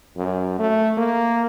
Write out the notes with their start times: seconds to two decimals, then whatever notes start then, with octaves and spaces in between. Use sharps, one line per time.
0.17 F#2
0.59 A3
0.98 A#3